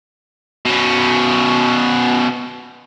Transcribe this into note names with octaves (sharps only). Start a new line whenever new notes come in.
B2 C#4